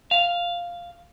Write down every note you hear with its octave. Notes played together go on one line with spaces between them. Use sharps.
F5